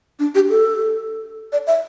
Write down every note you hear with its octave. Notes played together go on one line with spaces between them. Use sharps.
D4
G4
A4
D5
E5